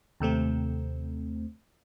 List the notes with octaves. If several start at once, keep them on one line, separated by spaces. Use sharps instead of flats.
D#2 C3 A3 C4